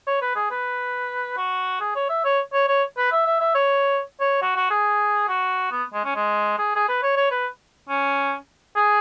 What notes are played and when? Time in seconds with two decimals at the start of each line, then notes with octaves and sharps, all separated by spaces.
0.07 C#5
0.21 B4
0.36 G#4
0.51 B4
1.37 F#4
1.80 G#4
1.95 C#5
2.09 E5
2.24 C#5
2.53 C#5
2.68 C#5
2.97 B4
3.12 E5
3.26 E5
3.40 E5
3.55 C#5
4.20 C#5
4.42 F#4
4.56 F#4
4.70 G#4
5.28 F#4
5.71 B3
5.94 G#3
6.05 C#4
6.15 G#3
6.58 G#4
6.76 G#4
6.89 B4
7.03 C#5
7.16 C#5
7.31 B4
7.89 C#4
8.76 G#4